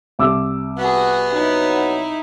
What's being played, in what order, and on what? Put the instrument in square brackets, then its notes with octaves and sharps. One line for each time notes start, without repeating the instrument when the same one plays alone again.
[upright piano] C2 D6 E6
[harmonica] B3 [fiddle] F#4 G#4
[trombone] F#3 [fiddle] D#4 E4